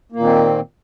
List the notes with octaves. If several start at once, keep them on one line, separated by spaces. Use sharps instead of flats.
A#2 D#3 A#3 C4